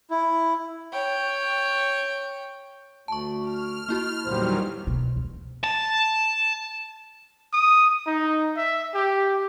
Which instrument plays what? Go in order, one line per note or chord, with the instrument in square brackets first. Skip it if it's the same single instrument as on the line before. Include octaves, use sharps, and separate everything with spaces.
[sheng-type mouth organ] E4
[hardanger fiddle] C#5 G5
[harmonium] D2 [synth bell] A5 C#6
[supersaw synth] F6
[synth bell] A#3 E4 F#4
[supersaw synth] E2 D#3 F#3 [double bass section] A#2 D3 G3 [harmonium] C5
[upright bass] B2
E2
[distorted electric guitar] A5
[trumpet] D#6
D#4
E5
G4